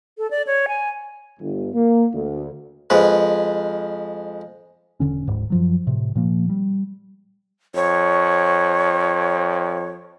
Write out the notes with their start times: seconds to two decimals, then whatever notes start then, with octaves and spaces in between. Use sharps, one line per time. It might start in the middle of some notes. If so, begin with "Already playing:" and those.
0.18 A4
0.31 D5
0.47 C#5
0.68 G#5
1.39 G1
1.74 A#3
2.13 D2
2.90 F2 G#3 B4
5.00 E1 D#2 D3 C#4
5.27 D1 G#2
5.50 F#2 F3 F#3
5.87 A2 C3
6.15 A#2 F3 A#3
6.49 G3
7.75 F2 C#5